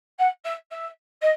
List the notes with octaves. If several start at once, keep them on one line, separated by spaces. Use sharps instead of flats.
F#5
E5
E5
D#5